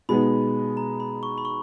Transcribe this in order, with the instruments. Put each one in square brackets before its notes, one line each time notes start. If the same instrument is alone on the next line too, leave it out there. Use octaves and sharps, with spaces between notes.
[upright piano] B2 G#3 B3 D#4 [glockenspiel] B5
[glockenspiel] A#5
B5
C#6
B5
C#6